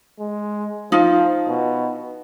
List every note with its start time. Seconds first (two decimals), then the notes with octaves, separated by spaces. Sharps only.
0.20 G#3
0.92 F3 D#4 F4
1.48 B2